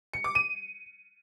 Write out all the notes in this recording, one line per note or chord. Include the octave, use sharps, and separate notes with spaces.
C#7
D6
D#7